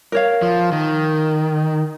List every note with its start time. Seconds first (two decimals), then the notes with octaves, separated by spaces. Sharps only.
0.12 A#4 C#5 F5
0.42 F3
0.72 D#3